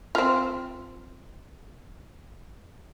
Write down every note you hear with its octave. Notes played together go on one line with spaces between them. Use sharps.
C4 F4